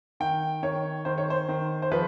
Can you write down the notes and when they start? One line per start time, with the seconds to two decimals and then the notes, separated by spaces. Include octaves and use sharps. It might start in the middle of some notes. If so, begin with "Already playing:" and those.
0.20 D#3 G5
0.63 D#3 C#5
1.05 D#3 C5
1.18 C#5
1.30 C5
1.48 D#3
1.82 C5
1.92 F3 B4